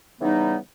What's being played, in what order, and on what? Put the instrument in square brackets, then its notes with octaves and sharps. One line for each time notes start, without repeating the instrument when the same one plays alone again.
[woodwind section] C#3 E3 G3 B3 D#4